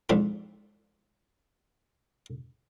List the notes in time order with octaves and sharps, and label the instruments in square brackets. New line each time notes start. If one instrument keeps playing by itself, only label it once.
[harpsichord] F2 G#2 D4 F4 B5